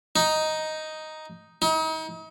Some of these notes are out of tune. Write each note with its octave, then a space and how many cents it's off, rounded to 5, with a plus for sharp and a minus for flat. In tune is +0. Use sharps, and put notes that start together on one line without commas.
D#4 +5
D#4 +40